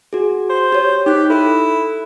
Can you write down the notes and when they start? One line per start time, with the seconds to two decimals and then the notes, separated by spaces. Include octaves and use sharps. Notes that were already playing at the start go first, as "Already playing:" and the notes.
0.13 F#4 G#4
0.50 C5
0.72 G4 C#5
1.06 D#4 G4 F#6 B6
1.30 E4 A4 F#6